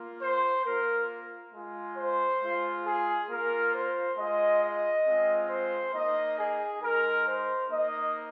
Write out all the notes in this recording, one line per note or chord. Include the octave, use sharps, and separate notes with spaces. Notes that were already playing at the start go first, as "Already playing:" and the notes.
Already playing: A#3 F4
C5
A#3 F4 A#4
G#3 F4
C5
G#3 F4
G#4
A#3 F4 A#4
C5
G#3 F4 D#5
D#5
G#3 C4 F4
C5
A#3 D#4 D#5
G#4
G#3 D#4 A#4
C5
A#3 D#4 D#5